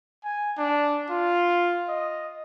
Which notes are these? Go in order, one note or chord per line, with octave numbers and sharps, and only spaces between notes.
G#5
D4
F4
D#5